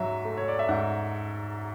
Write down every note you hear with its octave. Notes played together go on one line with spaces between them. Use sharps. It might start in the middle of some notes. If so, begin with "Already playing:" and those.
Already playing: G#2 F#3 E5
A3
C#5
D5
E5
G#2 F#5